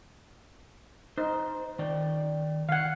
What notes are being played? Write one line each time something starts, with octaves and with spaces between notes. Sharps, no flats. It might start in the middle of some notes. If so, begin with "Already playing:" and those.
D#4 C5
D#3 D5 G5
D#3 F5 F#5